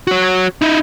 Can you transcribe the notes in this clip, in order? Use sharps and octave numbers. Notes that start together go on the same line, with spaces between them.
F#4 C#5
D#4 E4